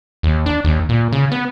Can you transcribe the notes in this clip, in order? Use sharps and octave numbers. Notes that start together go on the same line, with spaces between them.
D#2
D4
D#2
A#2
C#3
B3